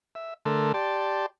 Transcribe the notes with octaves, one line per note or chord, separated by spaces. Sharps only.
E5
D3 A3 A4 A#4 C6
G4 D5 A5 C6